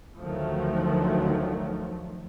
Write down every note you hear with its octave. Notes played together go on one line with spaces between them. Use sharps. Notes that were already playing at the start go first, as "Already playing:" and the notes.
D2 D#3 F3 F#3 A3